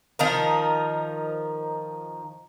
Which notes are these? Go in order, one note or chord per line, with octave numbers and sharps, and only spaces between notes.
D#3 F3 D#4 A#4